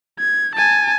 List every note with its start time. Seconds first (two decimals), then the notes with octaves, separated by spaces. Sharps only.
0.19 G#6
0.56 G#5 A5